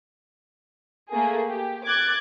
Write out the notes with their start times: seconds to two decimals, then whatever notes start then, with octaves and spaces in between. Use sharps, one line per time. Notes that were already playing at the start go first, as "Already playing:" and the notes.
1.11 A3 A#3 G#4
1.49 G4
1.86 D6 F#6 G#6 A6